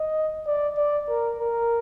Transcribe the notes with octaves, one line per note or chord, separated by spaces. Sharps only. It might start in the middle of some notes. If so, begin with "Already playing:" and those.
Already playing: D#5
D5
D5
A#4
A#4